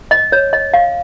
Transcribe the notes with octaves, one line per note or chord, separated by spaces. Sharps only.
D#5
C#5
D#5
F5